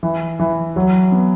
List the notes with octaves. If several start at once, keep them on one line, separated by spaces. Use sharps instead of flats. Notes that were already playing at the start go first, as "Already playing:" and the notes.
E3
E3
F#3
B3